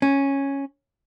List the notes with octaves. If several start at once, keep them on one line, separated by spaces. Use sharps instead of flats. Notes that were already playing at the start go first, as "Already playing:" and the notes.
C#4